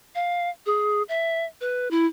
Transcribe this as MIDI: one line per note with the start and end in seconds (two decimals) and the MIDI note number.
0.15 0.50 77
0.66 1.03 68
1.09 1.45 76
1.61 1.88 71
1.91 2.06 64